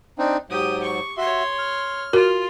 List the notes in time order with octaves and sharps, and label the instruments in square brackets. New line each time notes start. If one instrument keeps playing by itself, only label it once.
[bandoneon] C4 D4 D#4
[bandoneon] G#2 F#3 [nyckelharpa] G4 D#6
[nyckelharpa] C#6
[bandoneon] F#4 E5 [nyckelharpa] C#5 C6
[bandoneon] F6
[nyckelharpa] F4 [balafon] F#4 A#4